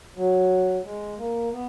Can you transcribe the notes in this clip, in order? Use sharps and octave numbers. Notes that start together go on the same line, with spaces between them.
F#3
G#3
A#3
B3